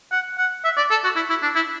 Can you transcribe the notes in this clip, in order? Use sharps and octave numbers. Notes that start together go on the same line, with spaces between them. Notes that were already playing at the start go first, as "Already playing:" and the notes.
F#5
F#5
E5
D5
A4
F#4
E4
E4
D4
E4